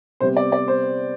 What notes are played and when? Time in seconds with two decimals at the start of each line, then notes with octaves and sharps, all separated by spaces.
0.20 C3 G3 B3 C5
0.37 D5
0.52 D5
0.68 C5